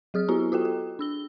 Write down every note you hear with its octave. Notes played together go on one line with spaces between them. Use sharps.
F#3 G#4 D#6 F6
B3 E4 F#4 G4 A#5
F4 F#4 A4 G5
A4
D4 E6 G7